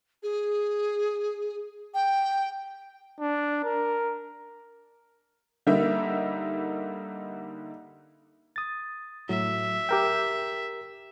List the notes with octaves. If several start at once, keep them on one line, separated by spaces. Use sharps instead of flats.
G#4
G5
D4
A#4
D3 G3 A#3 D#4 E5
D#6 A6
A2 F#3 E5
G4 A#4 G5